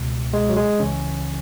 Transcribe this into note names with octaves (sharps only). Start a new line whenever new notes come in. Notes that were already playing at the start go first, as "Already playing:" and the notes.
Already playing: C#2 B2
G#3
F#3
G#3
C#2 C#3 E3 C#4